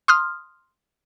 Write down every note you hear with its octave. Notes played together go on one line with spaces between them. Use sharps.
C6 D#6 F6